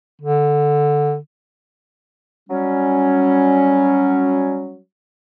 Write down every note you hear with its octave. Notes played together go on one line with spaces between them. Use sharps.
D3
F#3 G3 C#4